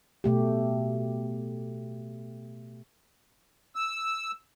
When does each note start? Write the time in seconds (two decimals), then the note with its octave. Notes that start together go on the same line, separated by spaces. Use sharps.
0.24 B2 A3 G4
3.75 E6